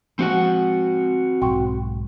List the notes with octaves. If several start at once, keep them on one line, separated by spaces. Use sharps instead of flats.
F3 G#3 C4 F#4 F#5
B1 G#2 G5 C6 C#6